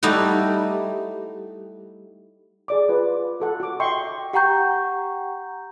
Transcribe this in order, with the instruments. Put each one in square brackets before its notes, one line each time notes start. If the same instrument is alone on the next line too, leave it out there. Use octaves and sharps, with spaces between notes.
[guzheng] G3 A3 D#4 E4 F#4
[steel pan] G#4 D5 D6
F4 B4
F#4 A4 F#5
F#4 D6
D#5 E5 G5 C6 C#6
[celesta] G4 F#5 G5 A#5 C#6 G6